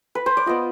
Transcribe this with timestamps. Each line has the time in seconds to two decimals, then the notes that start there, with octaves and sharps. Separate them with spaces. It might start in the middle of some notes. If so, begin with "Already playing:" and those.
0.15 B4
0.26 C5
0.37 D5
0.46 B3 F4 D#5